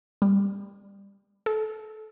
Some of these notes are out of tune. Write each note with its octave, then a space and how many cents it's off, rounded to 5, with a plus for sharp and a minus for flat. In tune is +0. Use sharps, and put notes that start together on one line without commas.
G3 +20
A4 -25